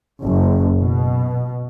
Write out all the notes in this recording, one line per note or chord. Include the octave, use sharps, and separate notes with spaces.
F#1
B2